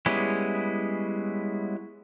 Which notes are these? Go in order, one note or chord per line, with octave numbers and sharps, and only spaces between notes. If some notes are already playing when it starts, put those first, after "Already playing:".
G3 G#3 B3 C#4 E4